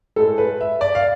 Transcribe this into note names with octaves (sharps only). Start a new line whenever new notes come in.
A2 G#3 A4
B4
E5
D5
F5